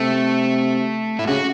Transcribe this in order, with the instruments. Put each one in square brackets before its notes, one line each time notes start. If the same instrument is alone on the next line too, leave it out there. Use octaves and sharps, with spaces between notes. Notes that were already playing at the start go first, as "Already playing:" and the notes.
Already playing: [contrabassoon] C3 [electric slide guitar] A3
[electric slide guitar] E4
[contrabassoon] C#3 [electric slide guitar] F#4